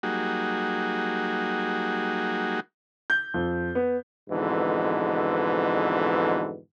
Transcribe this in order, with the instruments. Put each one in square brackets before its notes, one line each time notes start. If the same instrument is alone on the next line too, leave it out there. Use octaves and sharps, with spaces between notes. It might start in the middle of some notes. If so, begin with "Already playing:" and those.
[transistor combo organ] F#3 G3 A#3 D#4 F#4 G#4
[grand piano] G6
F2
B3
[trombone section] F2 G#2 B2 D3 E3